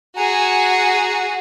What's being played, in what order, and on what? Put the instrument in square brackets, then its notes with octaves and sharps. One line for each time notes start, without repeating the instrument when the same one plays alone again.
[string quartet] F#4 G#4 [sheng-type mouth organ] F#5 G#5 A#5